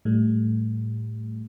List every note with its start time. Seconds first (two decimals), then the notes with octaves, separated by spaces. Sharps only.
0.05 A2 G3 A3